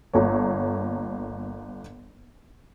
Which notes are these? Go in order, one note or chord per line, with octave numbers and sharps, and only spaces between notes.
G1 A#3 A4 C#5